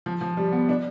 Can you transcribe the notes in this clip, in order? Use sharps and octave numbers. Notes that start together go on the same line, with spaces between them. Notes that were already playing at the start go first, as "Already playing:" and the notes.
F3
F3
G3
B3
D4